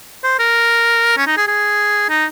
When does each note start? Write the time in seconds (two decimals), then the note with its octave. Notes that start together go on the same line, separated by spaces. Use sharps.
0.24 C5
0.39 A#4
1.17 C#4
1.27 D#4
1.37 G#4
1.47 G#4
2.09 D#4